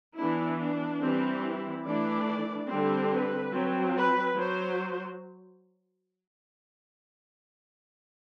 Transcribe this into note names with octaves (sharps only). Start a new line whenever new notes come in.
E3 B3 D4 E4
D4
E3 G3 C4
E4
E3 A3 D4 D5
D3 G3 C4
B4
F#3 C4
B4
F#3 C5